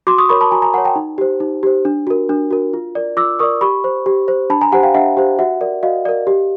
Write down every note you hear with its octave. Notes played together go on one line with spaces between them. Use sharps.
F#4 C6 D6
C#6 D#6
A#4 C#5 B5 C#6
A5 B5
F#4 G#5 A#5
G#5 A#5
A#4 C#5 F#5 G#5
G5 A5
D#4
G4 C5
D#4
G4 C5
D4
F#4 A#4
D4
F#4 A#4
F4
A#4 D5
F4 D6 E6
A#4 D5 C#6 D#6
G4 B5 C#6
C5
G4
C5
D4 A5 B5
G#5 A#5
G4 C5 F#5 G#5
F5 G5
D4 E5 F#5
G4 C5
F#4 E5 F#5
A#4 D5
F#4 D#5 F5
A#4 D5
G4